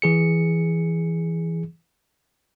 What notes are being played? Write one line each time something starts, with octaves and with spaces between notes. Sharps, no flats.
E3 G#4 C#7